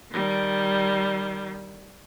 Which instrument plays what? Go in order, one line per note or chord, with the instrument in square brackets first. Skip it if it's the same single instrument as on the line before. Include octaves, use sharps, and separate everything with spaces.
[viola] D#3 G3